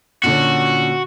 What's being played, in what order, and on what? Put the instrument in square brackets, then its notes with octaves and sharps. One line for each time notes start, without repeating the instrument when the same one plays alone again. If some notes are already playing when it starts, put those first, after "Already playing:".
[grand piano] A#2 D3 C#4 [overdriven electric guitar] F#4